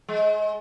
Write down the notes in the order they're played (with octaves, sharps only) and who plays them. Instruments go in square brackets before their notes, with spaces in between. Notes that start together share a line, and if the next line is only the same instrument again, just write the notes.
[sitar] G#3